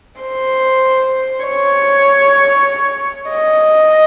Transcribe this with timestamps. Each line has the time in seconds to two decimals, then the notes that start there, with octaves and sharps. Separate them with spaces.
0.21 C5
1.44 C#5
3.29 D#5